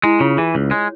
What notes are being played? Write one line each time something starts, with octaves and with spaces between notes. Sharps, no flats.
G#3 E4
C#3 F4
E3 G#4
C#2
G#3 C#5